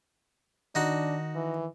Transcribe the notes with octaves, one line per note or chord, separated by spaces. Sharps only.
D#3 D4 D#4 F#4
E3